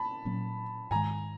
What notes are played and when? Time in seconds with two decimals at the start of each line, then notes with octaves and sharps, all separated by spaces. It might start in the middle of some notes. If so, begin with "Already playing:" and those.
Already playing: A5 B5
0.25 A#2 F#3 A#3 C#4
0.91 G#2 D#3 G#3 G#5 A#5